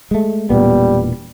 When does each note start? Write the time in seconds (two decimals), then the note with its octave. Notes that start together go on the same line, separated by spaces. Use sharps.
0.11 G#3 A3
0.50 E1 A#2 G3 B3